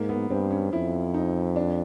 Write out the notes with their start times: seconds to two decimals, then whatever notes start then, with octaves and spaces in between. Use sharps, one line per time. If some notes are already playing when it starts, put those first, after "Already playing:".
Already playing: G#2 A#3
0.09 B3
0.30 G2 C4
0.50 C#4
0.72 F2 E4
1.14 D#4
1.56 D4